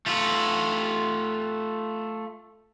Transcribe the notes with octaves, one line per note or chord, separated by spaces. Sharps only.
A3 F4